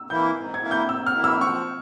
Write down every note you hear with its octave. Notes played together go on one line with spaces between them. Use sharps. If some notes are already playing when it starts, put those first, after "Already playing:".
Already playing: E6
E3 A#3 E4 G6
G#2
G#6
E3 A#3 E4
G6
G#2 E6
F6
E3 A#3 E4
E6
F3 C#6